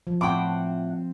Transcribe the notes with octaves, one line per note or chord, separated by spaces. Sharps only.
F3
A2 C4 F#5 G5 D6